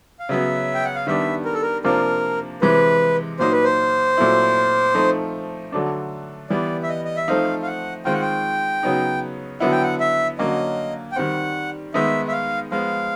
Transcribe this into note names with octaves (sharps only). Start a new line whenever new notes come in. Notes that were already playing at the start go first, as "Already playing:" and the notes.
F5
C#3 F#3 B3 E5
G5
F#5
F5
D#3 G3 B3 D4 E5
A#4
A4
A#4
C3 F3 A#3 D4 F4 A#4
C3 E3 G#3 B4
A#2 F#3 A#3 D#4 C5
B4
C5
A#2 F#3 A3 C4 E4
F3 A3 C4 D#4
D3 F#3 A3 D4
E3 G3 B3 D5
E5
D#5
D#5
E5
F3 A3 C4 D#4 F5
F5
F#5
D#3 G#3 C4 F4 G5
F#5
G5
C#3 F#3 B3 D#4
D3 F#3 B3 E4 F#5
G5
F#5
E5
D3 F#3 A#3 C#4 D#5
G5
D#3 G3 C4 F#5
D#3 G#3 B3 D#4 E5
E5
F5
F3 G#3 B3 F5